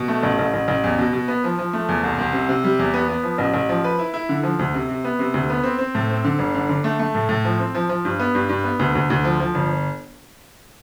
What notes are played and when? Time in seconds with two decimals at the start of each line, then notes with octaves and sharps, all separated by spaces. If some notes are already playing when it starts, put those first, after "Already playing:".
Already playing: B2
0.08 A3
0.23 A1
0.39 A1
0.54 A1
0.68 A1
0.84 E2
0.99 B2
1.13 B2
1.28 B3
1.44 F3
1.59 F3
1.73 A3
1.89 E2
2.04 C2
2.18 C2
2.33 C3
2.49 C3
2.64 G3
2.79 E2
2.94 B3
3.08 B3
3.23 F3
3.38 A1
3.54 A1
3.69 F3
3.84 B4
3.99 E4
4.14 E4
4.29 D3
4.43 F3
4.59 D2
4.74 C3
4.89 C3
5.04 B3
5.19 C3
5.34 D2
5.50 B3
5.64 C4
5.79 C4
5.95 A2
6.10 C4
6.25 D3
6.39 G1
6.55 D3
6.69 D3
6.84 A3
6.99 A3
7.15 A2
7.29 A2
7.45 F3
7.60 C4
7.75 F3
7.89 F3
8.05 G2
8.20 B3
8.35 G2
8.49 G2
8.64 B3
8.79 D2
8.95 D2
9.10 D2
9.24 F3
9.40 F3
9.55 G1